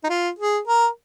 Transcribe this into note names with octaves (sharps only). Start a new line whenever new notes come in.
D#4
F4
G#4
A#4